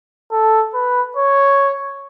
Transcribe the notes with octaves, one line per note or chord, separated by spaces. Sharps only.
A4
B4
C#5